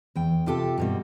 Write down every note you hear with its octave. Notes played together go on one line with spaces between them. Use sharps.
E2 G5
C3 F4 G4 A4
G2 B2 G3